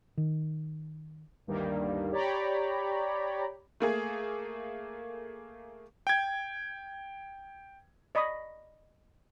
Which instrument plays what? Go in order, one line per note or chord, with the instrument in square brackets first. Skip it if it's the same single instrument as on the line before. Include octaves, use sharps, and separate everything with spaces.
[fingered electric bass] D#3
[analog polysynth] D2 G2 D#3 G3 A#3
G4 C#5 D5 G5 A#5 B5
[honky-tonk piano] A3 A#3 G#4
[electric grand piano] G5 G#6
[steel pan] D5 D#5 B5 C#6 D#6